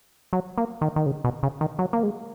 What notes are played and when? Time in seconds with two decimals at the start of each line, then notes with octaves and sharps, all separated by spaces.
0.33 F#3
0.58 A#3
0.81 D#3
0.96 D#3
1.06 C#3
1.24 B2
1.43 C#3
1.61 D#3
1.79 F#3
1.93 A#3
2.03 G#3